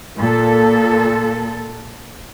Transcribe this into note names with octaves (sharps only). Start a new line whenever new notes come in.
A#2 A4